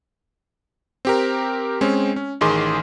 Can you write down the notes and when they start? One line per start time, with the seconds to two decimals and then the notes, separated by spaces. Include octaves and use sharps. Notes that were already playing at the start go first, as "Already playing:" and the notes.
1.05 C4 G4 A#4
1.81 G#3 C4 C#4
2.16 C#4
2.41 A1 D#3 G#4 C6 D6